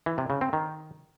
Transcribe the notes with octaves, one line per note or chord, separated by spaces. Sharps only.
E3
C3
C#3
C4
D#3